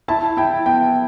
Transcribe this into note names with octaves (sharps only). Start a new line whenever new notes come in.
E4 A5
E4 G5
B3 G5